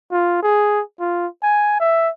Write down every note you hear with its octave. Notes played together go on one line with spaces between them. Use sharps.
F4
G#4
F4
G#5
E5